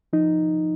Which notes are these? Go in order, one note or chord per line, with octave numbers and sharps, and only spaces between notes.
F3 D#4